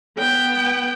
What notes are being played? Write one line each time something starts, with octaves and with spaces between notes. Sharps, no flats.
B3 G5